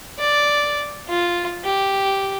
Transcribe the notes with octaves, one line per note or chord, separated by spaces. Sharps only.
D5
F4
G4